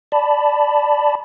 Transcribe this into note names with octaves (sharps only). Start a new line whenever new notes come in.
D5 A5 B5